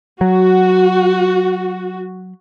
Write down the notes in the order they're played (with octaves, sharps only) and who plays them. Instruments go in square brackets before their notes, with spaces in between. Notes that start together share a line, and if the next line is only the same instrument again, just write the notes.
[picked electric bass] F#3 [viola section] F#4